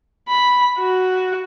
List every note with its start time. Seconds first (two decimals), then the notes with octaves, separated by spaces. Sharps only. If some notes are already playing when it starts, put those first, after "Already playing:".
0.29 B5
0.79 F#4